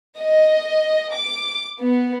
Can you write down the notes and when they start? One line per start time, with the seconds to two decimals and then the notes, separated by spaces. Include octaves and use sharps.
0.18 D#5
1.13 D6
1.79 B3